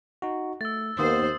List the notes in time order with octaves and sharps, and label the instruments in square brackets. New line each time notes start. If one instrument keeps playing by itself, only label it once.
[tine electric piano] D#4 F#4
[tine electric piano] A3 [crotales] E6 A6
[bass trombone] D#2 [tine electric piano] D#3 A#3 B3 [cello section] C5 [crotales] D#6